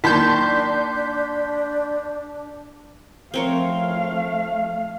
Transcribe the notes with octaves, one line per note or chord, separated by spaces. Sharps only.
D#3 A#3 D4 A5 C6 G6 B6
F3 A3 C4 A#4 C#5 F5